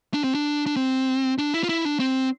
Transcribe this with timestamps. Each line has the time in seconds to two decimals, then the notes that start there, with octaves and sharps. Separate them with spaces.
0.14 D4
0.24 C4
0.35 D4
0.67 D4
0.76 C4
1.38 D4
1.54 E4
1.63 F4
1.69 E4
1.85 D4
2.00 C4